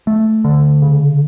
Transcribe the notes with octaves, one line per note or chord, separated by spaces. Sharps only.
A3
D3
C#3